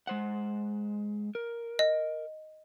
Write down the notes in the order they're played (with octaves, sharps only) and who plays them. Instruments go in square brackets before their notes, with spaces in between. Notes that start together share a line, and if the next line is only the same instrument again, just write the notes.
[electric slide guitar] G#3 C5 F#5
A#4
[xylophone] D#5